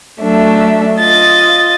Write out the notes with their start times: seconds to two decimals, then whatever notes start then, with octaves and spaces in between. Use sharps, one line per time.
0.21 F#3 A3 D4 E5
0.99 F4 D#5 A6